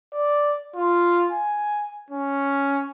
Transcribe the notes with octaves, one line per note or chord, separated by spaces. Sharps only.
D5
F4
G#5
C#4